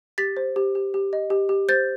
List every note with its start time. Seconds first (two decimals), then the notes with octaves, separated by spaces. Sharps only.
0.18 G4 A6 B6
0.37 C5
0.56 G4
0.75 G4
0.94 G4
1.13 D#5
1.30 G4
1.49 G4
1.69 C5 G6 A6